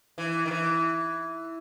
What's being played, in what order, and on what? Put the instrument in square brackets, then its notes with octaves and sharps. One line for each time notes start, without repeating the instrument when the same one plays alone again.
[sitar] E3
D#3
E3